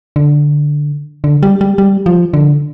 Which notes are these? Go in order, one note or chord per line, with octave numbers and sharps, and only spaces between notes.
D3
D3
G3
G3
G3
F3
D3